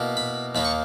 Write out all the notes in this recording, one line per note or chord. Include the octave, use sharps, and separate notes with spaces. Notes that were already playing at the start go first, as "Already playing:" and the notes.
Already playing: B2 A#3 E4
B5
D#2 D#3 A#3 B5
C#6